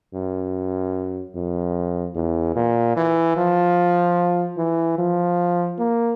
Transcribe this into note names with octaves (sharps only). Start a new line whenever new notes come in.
F#2
F2
E2
A#2
E3
F3
E3
F3
A#3